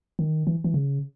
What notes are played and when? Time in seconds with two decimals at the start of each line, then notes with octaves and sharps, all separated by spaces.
0.19 D#3
0.47 E3
0.64 E3
0.74 C#3